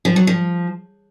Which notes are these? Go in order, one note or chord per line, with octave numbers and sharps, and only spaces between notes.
F3
F#3
F3